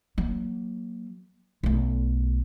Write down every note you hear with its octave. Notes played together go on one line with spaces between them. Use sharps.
F#3 A#3
B1 A3